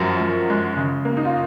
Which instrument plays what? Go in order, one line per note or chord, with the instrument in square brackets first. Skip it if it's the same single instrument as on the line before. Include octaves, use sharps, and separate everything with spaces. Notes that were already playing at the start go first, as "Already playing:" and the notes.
Already playing: [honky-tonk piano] F#2 F3 F#4 A#4
F#2
G#3
C#3
A#3
D#4
F4